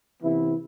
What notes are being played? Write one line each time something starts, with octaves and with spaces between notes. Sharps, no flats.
C3 E3 B3 E4